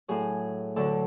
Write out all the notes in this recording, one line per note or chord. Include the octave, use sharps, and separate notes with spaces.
A2 F#3 G#4
D2 D3 F#3 A4